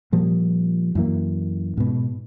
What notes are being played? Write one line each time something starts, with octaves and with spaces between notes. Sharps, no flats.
A#2 F3 G3 A#3
F#2 E3 A#3
G#2 B2